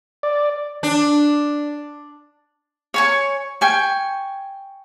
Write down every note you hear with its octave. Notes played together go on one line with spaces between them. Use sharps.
D5
D4
C#5 G#5 C#6
G5 G#5 C#6